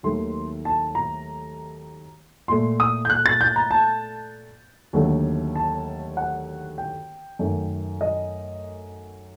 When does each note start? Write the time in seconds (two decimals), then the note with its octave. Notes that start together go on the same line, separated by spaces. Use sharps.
0.03 D#2 D#3 F#3 A3 C6
0.65 A5
0.95 A#5
2.48 A#2 A3 C6
2.80 D#6
3.05 G6
3.10 F#6
3.26 A6
3.41 G6
3.56 A#5
3.71 A5
4.93 D#2 D3 F#3 A3
5.56 A5
6.17 F#5
6.78 G5
7.39 F#2 D#3 A3
8.01 D#5